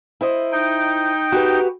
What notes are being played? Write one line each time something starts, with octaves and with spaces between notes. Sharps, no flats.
E4 C5 D#5
D#4 G5
F#4 G4 B4